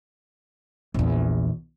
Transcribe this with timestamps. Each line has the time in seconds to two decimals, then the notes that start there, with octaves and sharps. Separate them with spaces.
0.94 A#1 E2